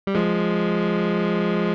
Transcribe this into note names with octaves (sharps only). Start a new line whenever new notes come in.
G3
F3 G#3